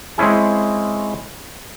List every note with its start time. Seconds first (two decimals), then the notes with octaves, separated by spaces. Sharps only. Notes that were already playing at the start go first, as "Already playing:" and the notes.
0.18 G#3 C4 C#4 E4 G#4